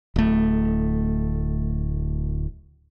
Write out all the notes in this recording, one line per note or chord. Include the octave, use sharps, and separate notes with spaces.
D1 A3